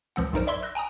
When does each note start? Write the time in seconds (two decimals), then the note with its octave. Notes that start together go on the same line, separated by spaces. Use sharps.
0.16 C#2 F3 C4 F#5
0.33 B1 G2 D#4 A#4 C5
0.47 D5 E5 B5 C6 E6 G#6
0.63 E6 F#6 A#6
0.75 G5 G#5 A#5 D#6